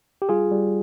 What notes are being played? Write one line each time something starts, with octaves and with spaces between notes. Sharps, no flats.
G4
G3 F4 G#4
G3